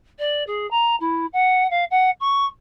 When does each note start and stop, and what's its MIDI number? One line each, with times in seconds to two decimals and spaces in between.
0.19 0.43 74
0.47 0.69 68
0.70 0.96 82
1.00 1.26 64
1.33 1.69 78
1.70 1.84 77
1.90 2.10 78
2.20 2.45 85